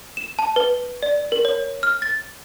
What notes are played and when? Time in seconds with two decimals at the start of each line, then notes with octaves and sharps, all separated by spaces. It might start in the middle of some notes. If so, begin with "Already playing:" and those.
0.17 E7
0.39 A5
0.56 B4
1.03 D5
1.32 A#4
1.45 C#5
1.83 F6
2.02 A6